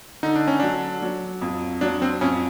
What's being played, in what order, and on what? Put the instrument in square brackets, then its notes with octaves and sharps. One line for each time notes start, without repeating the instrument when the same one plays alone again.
[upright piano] D3 [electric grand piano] D#4
[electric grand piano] D4
C#4
[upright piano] F#3 [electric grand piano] D4
[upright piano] F#3
F2
[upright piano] F#3 [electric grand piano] D4
[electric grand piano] C4
[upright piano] F2 [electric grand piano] C#4